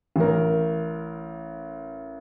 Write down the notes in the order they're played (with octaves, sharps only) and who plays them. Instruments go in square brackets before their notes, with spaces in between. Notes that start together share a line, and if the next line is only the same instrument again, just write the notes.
[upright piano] A1 A#4